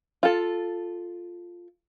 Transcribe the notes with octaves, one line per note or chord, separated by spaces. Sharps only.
F4 A4